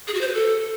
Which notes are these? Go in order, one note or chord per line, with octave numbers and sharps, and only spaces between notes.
G#4
F#4
C5
B4
A4